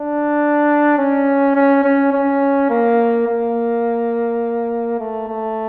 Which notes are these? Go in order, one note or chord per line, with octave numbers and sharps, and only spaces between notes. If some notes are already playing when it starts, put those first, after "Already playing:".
Already playing: D4
C#4
C#4
C#4
C#4
A#3
A#3
A3
A3